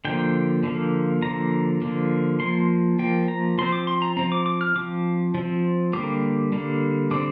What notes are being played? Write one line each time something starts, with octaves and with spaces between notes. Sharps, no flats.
D3 F3 A#3 G5
D3 F3 A#3
D3 F3 A#3 A#5
D3 F3 A#3
F3 A#3 C6
F3 A#3 G5
A#5
F3 C4 C6
D6
C6
A#5
F3 C4 A#5
D6
D6
F6
F3 C4 D6
F3 C4
D3 G3 A#3 D6
D3 G3 A#3
D3 G3 C4 D6